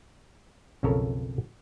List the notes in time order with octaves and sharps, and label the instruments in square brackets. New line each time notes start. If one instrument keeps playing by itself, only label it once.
[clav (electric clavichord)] B1 F2 C#3 A4 A#4 C#5